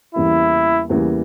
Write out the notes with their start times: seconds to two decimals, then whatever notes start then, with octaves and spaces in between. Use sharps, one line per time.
0.15 E2 C#3 E3 G3 A#3 E4
0.90 E2 C#3 E3 G3 A#3